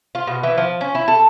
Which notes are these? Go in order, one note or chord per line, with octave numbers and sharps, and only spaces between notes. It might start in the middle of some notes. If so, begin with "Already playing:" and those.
F4
B2
E3
F3
C#4
E4
A4